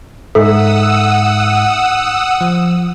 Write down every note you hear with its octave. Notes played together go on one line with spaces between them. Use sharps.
G#2 D#4 A4 E5 F#5 D#6 E6
F3